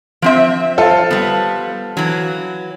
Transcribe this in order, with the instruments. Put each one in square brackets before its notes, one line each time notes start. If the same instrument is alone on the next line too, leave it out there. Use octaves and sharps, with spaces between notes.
[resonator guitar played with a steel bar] F3 C4 E5
[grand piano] F4 A4 C5
[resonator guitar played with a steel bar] G3 B3
E3 F#3